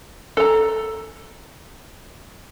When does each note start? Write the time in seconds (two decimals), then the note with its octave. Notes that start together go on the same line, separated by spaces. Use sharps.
0.37 A4 A#5